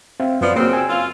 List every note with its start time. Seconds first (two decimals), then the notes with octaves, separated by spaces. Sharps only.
0.20 C4 E5 F5
0.41 F#2 F3 B3 D5
0.56 C#3 A#3 C4 F#4
0.73 G#5 E6
0.89 F#2 F4